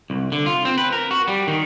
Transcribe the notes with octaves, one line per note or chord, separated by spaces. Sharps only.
C2
D3
F4
C4
B4
A#4
F#4
G3
D#3